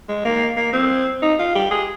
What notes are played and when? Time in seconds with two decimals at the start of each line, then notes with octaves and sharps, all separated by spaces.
0.09 G#3
0.25 A#3
0.57 A#3
0.73 C4
1.22 D#4
1.39 F4
1.55 G4
1.71 G#4